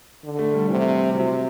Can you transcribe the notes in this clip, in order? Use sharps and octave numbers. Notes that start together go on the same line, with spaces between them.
D3
A3
G3
C3 E3
C3 F#3